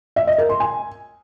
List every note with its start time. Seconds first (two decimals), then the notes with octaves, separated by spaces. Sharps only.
0.16 E5
0.27 D#5
0.38 A#4
0.49 C6
0.60 G#5